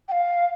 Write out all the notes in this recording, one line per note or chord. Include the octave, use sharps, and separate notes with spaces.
G5
F5